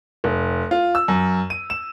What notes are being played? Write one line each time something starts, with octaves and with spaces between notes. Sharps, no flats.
F1
F4
E6
F#2
D#7
E7